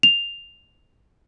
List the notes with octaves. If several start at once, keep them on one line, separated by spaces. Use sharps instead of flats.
F7